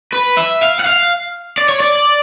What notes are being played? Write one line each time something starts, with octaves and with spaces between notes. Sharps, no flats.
B4
E5
F5
F#5
F5
D5
C#5
D5